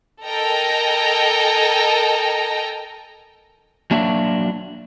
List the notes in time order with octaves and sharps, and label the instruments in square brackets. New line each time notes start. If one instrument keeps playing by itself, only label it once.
[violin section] A4 A#4 D#5 G5 G#5 A#5
[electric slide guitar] F#3 A#3 D4 F#4 E5